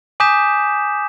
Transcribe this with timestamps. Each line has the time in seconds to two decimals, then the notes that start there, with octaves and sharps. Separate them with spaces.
0.20 G#5 D6 D#6 G6 B6 E7